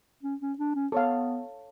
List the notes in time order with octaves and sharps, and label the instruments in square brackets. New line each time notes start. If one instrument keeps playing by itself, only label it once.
[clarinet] C#4
C#4
D4
C#4
[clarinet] B3 [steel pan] A4 C#5 F5